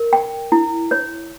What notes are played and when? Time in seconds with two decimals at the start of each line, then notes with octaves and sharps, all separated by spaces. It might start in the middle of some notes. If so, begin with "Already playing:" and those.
Already playing: A#4
0.13 G5
0.52 E4
0.91 C#5